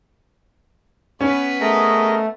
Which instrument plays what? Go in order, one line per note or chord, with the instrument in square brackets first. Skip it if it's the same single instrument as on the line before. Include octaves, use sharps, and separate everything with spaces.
[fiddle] B3 B4 [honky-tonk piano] C#4
[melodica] A3 [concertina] G#4 A#4 D#5